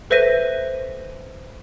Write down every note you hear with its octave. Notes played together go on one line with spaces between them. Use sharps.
A4 B4 C5 E5 A#6 D#7